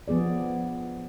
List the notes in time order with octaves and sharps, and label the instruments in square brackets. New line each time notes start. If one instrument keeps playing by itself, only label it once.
[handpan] F3 B3 G#4 D5